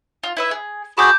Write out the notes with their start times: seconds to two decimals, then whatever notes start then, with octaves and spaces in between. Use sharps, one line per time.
0.23 F4
0.37 E4 B4 E5
0.51 G#4
0.98 F#4 G#4 A5 B5 D6 G6